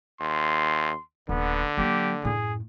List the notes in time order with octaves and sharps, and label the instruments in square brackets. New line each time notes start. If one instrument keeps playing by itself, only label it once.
[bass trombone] D#2 [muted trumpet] C6
[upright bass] D#1 [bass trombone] D3 [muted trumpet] B3
[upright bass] F#3 A#3 [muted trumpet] G4
[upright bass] F#2 A2 [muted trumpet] G#4